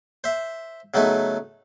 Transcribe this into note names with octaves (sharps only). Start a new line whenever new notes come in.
C5 E5
C#3 F#3 A3 B3 D#4